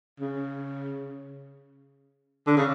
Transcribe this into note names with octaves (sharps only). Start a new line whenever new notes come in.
C#3
D3
C#3